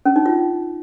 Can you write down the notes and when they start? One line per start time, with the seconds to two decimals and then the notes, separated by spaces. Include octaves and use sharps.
0.06 C#4
0.16 D#4
0.26 F4